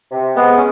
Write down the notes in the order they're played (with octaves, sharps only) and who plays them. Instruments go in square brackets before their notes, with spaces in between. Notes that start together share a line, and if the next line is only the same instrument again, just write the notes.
[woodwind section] C3
[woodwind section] G#3 [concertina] B3
[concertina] C#4